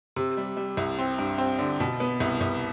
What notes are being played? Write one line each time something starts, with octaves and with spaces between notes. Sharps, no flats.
C3
G3
G3
C2
C4
G2
C4
D3
B2
B3
C2
C2